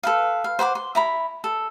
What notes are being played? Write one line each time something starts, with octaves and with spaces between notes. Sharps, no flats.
A4 B4 F5
F5
C5 F#5 B5 D6
C6
E4 A#5 B5
A4